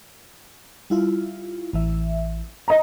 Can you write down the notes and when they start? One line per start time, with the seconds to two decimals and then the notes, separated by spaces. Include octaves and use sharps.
0.90 G3 E4 F4
1.73 A1 E3 E5
2.68 D#5 A#5